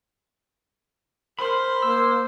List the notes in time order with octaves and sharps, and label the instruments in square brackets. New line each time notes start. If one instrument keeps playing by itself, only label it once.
[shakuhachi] A#4 [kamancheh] C5 [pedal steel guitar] B5
[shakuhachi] A#3 [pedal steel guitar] E6